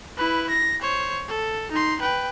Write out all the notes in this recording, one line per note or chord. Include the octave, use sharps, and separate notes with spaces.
E4 B4
A#6
C5 C#5
A4
D#4 C6
B4 G5